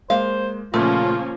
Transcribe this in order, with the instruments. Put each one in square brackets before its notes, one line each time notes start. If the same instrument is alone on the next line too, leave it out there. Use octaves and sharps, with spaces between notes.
[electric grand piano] G#3 A#3 [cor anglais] C5 [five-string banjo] F5
[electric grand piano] A#2 C#3 [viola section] F3 A#3 C#4 [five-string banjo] A3 [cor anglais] F4